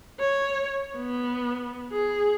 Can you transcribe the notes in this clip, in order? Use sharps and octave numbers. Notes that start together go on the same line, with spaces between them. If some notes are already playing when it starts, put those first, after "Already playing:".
C#5
B3
G#4